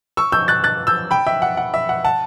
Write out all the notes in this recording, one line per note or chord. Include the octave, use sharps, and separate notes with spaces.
C#6 E6
E6 G6
F#6 A6
F#6 A6
E6 G6
G5 B5
E5 G5
F#5
F#5
E5
F#5
F#5 A5